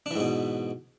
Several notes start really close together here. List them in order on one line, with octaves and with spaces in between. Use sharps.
D4 E3 G#2 B2